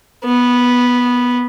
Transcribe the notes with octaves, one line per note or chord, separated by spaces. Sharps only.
B3